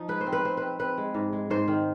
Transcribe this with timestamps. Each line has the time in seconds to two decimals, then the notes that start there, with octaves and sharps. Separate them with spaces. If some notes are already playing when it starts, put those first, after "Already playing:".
Already playing: F3 D#4
0.08 G#3 B4
0.21 C5
0.26 C4
0.33 B4
0.44 C4 C5
0.57 C4 B4
0.79 C4 B4
0.97 G#3
1.14 G#2
1.33 G#3
1.50 G#2 C5
1.68 D#3